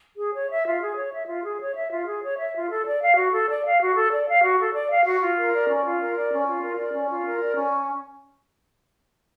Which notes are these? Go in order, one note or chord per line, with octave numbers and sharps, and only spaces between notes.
G#4
C#5
E5
F4
G#4
C#5
E5
F4
G#4
C#5
E5
F4
G#4
C#5
E5
F4
A4
D5
F5
F#4
A4
D5
F5
F#4
A4
D5
F5
F#4
A4
D5
F5
F#4
F4
A#4
D5
C#4
F4
A#4
D5
C#4
F4
A#4
D5
C#4
F4
A#4
D5
C#4